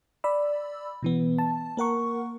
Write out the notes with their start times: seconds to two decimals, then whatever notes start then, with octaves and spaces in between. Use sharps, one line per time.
0.24 D5 B5 E6
1.03 B2 E3 B3
1.38 A5
1.77 A#3 A#4 F#5 C#6